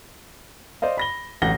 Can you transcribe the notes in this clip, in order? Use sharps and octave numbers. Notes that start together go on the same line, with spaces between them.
C5 D5 D#5 F5
B5 A#6 G7
D1 A1 F#5 A#6 G7